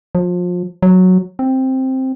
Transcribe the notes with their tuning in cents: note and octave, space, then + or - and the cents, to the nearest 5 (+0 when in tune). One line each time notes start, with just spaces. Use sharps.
F3 +30
F#3 -5
C4 +5